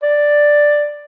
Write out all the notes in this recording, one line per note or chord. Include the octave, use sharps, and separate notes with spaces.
D5